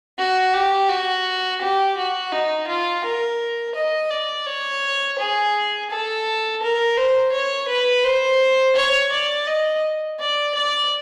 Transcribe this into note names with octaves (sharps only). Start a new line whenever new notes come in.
F#4
G4
F#4
G4
F#4
D#4
F4
A#4
D#5
D5
C#5
G#4
A4
A#4
C5
C#5
B4
C5
C#5
D5
D#5
D5
D5